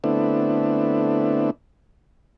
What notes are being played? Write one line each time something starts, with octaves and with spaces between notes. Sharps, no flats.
D3 A3 B3 C4 D4 E4